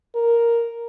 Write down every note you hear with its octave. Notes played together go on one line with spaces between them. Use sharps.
A#4